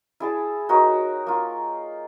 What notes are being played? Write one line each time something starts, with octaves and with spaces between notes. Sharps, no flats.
E4 G#4 A5
D#4 F#4 A#4 C#5
A#3 F4